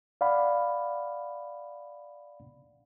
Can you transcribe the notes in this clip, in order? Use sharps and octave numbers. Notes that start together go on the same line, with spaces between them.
D5 F5 F#5 B5